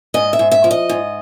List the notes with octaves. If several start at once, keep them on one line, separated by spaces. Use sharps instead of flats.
G#2 D#5
E5
G#2
E5
F3
D#5
G#2